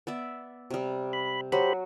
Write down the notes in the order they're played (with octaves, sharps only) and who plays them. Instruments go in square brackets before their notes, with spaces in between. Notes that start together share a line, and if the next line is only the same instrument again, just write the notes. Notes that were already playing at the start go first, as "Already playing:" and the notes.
[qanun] B3 D5 E5
C3 G3
[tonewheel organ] B5
[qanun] F#3 F#4 [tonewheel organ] G4 C5 B5